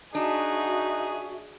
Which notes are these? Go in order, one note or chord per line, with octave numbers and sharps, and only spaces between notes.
D4 D#4 F#4 G#4 E5